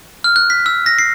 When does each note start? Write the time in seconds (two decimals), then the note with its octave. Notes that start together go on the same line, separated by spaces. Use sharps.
0.24 F6
0.36 F#6
0.50 B6
0.66 E6
0.86 A#6
0.99 C7